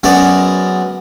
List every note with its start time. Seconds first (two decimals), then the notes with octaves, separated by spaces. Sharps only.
0.03 F#2 G#3 B3 D5